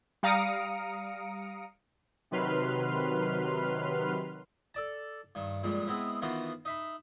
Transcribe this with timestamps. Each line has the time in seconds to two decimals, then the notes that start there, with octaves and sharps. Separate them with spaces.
0.23 G3 F5 A#5 D#6 C#7 D7
2.31 C3 D#3 F#3 B4 C6 F6
4.75 A4 D5 A5
5.35 G2 D#3
5.63 F2 A#2 G3 G#3
5.87 G#3 B3 C4 E4
6.22 D#3 E3 B3 F4 F#4 C5
6.65 D#4 E5 B5